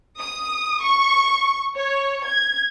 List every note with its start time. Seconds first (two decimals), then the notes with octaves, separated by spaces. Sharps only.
0.18 D#6
0.83 C#6
1.74 C#5
2.25 G#6